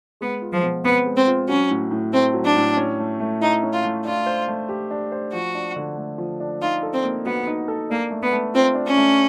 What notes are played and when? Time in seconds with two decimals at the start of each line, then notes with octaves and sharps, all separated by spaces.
0.21 G#3 B3
0.42 F4
0.52 F3
0.63 B2
0.84 B3 C4
1.06 G#3
1.16 C4
1.27 F4
1.48 F#3 C#4
1.70 A2
1.91 A2
2.13 A3 C4
2.34 F#3
2.45 D4
2.56 A2
2.77 C#4
2.99 A3
3.20 A3
3.41 D#4 E4
3.62 C#4
3.73 F4
3.84 A3
4.05 D4 F4
4.26 C5
4.48 A3
4.69 G4
4.91 D4
5.12 C5
5.33 F3 F#4
5.55 D4
5.76 D3
5.97 A3
6.18 F3
6.40 D4
6.61 D#4 F4
6.83 A4
6.93 C4
7.04 A#3
7.25 B3 F#4
7.47 D#4
7.68 A4
7.90 A#3 D4
8.11 A3
8.22 B3
8.32 A3
8.54 C4 F4
8.75 D4
8.86 C#4
8.97 A3